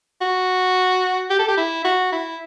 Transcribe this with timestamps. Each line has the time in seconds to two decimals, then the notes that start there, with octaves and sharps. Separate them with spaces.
0.21 F#4
1.30 G4
1.39 A4
1.48 G4
1.57 E4
1.85 F#4
2.12 E4